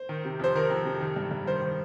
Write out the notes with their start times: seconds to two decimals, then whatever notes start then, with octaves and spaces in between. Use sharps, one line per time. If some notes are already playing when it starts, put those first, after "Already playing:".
Already playing: C5
0.09 D#3
0.25 C3
0.40 F2 C5
0.56 D#3 A#4
0.70 F2
0.85 C3
1.00 D#3
1.16 G2
1.31 G2
1.46 D#3 C5
1.62 D#3